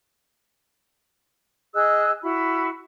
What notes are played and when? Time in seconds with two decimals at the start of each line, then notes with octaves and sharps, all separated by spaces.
1.74 G#4 D#5 E6 F#6
2.23 E4 F#4 B5